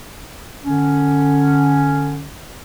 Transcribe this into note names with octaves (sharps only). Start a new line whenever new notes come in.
D3 C#4